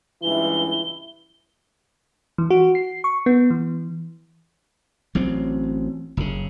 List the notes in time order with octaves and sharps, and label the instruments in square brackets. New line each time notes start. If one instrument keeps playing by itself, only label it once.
[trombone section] C#2 G2 E3 [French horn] E4 [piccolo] G7
[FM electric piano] E3
F#4
C7
C#6
B3
E3
[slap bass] A1 F#3 C4
F#1 A#2 C#3